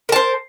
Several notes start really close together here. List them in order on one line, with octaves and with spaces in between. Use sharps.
A#4 A5 C5